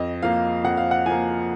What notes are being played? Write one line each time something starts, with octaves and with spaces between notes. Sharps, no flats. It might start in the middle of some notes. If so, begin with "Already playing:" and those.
Already playing: F2 D#5
F3 A#3 F5
F2 F#5
F5
F#5
F3 A#3 G#5